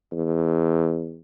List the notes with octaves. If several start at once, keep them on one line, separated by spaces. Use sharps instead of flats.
E2